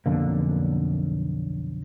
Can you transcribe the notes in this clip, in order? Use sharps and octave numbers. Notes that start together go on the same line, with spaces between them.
B1 F2 D3 A#3